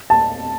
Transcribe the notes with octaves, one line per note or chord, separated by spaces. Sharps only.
A5